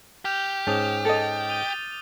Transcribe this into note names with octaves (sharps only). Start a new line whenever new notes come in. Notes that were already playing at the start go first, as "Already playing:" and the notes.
G4 F6 G6 F7
G#2 C#4 A5 D6 D#6 G6
A4 D#5 A6
D#6 D#7 G7